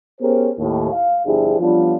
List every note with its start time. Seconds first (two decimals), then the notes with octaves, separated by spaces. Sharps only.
0.21 B3 C#4 G4 G#4 A#4 C5
0.58 D#2 A2
0.92 F5
1.25 G1 F3 D4 E4 G4 G#4
1.60 F3 G3 B3 C#4 D4 F4